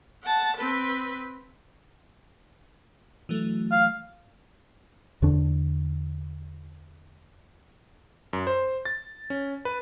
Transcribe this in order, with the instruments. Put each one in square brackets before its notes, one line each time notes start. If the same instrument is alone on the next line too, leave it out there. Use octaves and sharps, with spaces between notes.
[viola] F#5 A5
C4 B4
[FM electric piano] E3 F#3 A3
[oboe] F5
[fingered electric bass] E2 D3 D4
[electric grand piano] F#2
C5
A6
C#4
B4